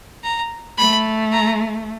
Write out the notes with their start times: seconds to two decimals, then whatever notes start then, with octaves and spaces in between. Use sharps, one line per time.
0.24 A#5
0.78 A3 B5
1.32 A#5